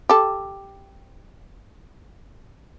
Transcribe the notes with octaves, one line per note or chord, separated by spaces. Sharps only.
G4 A4